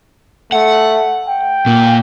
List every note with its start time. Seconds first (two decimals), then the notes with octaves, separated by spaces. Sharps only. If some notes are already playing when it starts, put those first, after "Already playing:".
0.52 A3 F#5
1.28 G5
1.66 A#2 A#3